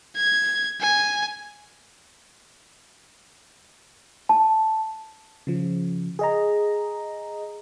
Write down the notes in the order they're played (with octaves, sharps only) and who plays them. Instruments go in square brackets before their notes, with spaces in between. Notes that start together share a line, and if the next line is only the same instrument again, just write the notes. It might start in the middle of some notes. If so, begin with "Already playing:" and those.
[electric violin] G#6
G#5
[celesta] A5
[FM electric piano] C#3 F3
G#4 D#5 A#5